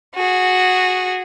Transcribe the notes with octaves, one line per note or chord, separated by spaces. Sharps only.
F#4 G#4